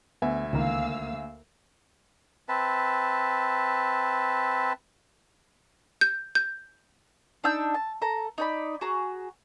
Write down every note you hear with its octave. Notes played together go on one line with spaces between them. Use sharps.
D2 B3 E5 G#5
C#2 D#3 A#3 A#4 F5 E6
C4 B4 E5 A5
G6
G6
D4 D#4 E6 G6
A5
A4 A#5
D#4 D5 B5
F#4 G#4 A#5